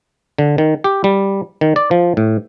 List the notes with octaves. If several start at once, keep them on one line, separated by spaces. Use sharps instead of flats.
D3
D#3
G4
G3
D#3
D5
F3
A2